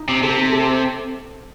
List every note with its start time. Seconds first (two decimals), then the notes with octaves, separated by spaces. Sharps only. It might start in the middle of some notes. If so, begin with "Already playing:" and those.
Already playing: D#4
0.09 C3
0.23 C3 A4
0.52 A4